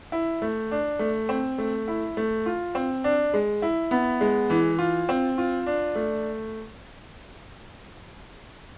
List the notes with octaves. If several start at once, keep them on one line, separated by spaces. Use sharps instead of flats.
E4
A3
D4
A3
C4
A3
E4
A3
F4
C4
D4
G#3
E4
B3
G#3
E3
F4
C4
F4
D4
A3